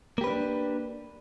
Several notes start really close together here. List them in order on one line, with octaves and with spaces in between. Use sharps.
A#3 G4 B4 C#4 D4